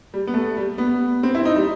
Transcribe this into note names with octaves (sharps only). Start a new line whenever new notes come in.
G3
B3
A3
G3
B3
C4
E4
D#4
G3